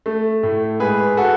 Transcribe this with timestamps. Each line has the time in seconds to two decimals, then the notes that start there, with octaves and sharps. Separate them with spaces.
0.06 A3
0.43 A2
0.80 G#2 G#4 B4
1.17 F#4 A4